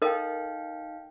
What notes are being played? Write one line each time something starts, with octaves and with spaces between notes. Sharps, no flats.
D#4 A4 A#4 D#5 F5 G5